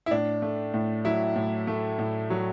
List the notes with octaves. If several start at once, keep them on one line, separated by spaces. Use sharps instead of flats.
E4
A2 D4
A3
A2
F#3 E4
A2
A3
A2
F#3